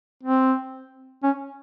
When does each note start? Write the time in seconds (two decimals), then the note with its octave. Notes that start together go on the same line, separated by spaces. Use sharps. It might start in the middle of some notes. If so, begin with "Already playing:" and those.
0.23 C4
1.23 C#4